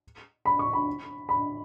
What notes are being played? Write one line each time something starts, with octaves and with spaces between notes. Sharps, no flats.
B5
C#6
B5
B5